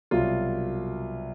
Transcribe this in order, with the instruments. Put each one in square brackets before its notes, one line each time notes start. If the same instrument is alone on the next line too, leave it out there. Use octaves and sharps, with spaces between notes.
[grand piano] C2 B2 F#3 F4